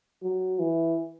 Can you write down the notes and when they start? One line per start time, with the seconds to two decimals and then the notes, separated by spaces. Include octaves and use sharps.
0.23 F#3
0.59 E3